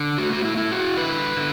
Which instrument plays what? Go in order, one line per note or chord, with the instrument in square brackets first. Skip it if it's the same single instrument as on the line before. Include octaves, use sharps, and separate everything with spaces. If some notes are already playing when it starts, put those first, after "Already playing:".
Already playing: [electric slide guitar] D3
A3 F#4
F#4
E4
E4
F#4
D3 B4
D3